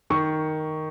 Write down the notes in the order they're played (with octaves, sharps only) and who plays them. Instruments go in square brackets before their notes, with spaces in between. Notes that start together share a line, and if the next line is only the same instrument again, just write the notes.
[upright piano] D#3 C#6